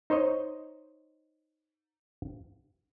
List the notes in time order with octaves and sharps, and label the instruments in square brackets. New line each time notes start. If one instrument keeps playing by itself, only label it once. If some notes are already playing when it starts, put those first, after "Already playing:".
[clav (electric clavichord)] D#4 C5 C#5 D#5